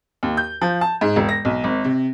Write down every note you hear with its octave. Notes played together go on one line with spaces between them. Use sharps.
D#2
G6
F3
A5
G#2
E1
A#6
B1
G#1
C3